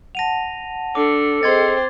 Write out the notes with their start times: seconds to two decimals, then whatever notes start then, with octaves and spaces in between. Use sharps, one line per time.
0.15 F#5 A5 A#6 D#7 F7
0.95 D4 A4 D6
1.43 C4 G#4 C5 D#5 C6 G#6 A6